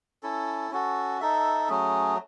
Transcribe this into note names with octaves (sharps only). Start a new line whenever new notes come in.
C#4 E4 A4
C#4 F#4 A4
D#4 A4 E5
F#3 A3 C#4 G#4